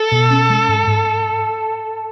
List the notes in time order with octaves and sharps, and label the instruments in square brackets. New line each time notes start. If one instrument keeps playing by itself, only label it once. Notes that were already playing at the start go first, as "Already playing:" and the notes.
Already playing: [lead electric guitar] A4
[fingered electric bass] B2
C#4
G#3
G#2
G#2